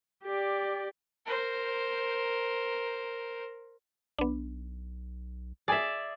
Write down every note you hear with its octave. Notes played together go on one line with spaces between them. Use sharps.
G4 D5
A#4 C5
B1 B3 D4
G#4 D5 E5 G#5